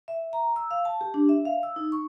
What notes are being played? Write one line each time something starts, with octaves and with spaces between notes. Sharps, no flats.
E5
A#5
E6
F5
A5
G4
D4
E5
F5
E6
D#4
C#6